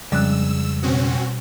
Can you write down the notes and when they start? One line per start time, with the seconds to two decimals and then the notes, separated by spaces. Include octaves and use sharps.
0.12 F2 C#3 G3 G#3 D5 E6 F#6
0.83 B2 C4 C#4 F#4